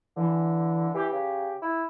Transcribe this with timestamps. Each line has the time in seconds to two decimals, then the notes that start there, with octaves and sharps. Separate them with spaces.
0.16 D3 E3
0.94 E3 G4
1.12 C#3
1.62 E4